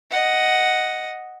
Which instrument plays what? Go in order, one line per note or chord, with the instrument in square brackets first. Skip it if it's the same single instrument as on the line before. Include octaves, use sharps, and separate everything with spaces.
[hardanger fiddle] D#5 F#5